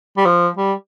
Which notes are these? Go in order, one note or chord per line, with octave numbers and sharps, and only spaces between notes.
G3
F3
G3